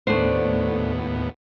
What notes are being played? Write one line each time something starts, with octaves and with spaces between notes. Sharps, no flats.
D#2 A2 A3 B3 D4 C5